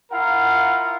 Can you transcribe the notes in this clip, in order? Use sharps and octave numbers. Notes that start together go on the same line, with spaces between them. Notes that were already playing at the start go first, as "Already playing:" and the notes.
E4 F4 A#4 F5 F#5